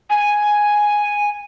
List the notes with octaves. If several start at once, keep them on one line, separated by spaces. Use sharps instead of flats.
G#5